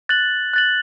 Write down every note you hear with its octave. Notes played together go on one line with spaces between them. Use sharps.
F#6 A6 F#7
F#6 A6 F#7